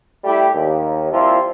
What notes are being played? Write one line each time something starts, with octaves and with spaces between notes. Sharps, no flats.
G3 A3 E4 G4
D#2
F3 G3 A#3 C4 E4 F4